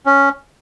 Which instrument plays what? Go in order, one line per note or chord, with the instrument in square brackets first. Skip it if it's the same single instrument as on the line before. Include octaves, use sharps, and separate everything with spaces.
[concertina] C#4